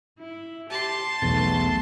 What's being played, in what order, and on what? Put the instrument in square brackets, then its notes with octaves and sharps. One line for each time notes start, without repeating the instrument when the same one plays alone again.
[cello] E4
[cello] G4 [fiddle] A5 C6
[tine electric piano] B1 E2 A6 [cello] F#3 A3